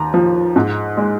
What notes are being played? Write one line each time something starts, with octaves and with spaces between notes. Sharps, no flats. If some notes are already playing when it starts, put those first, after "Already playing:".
Already playing: D#2 A#5
F3
G#2
G#3